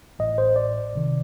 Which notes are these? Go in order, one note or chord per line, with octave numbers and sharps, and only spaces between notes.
A1 A2 D#5
C5
D5
C2 C3 D#3